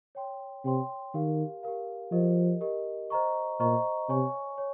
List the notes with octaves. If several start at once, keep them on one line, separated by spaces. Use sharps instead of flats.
C#5 G5 C6
C3 C#5 G5 C6
D#3 G4 A#4 F5
G4 A#4 F5
F3 G4 A#4 D#5
G4 A#4 D#5
C5 D#5 A#5 C#6
A#2 C5 D#5 A#5 C#6
C3 C#5 G#5 C#6
C#5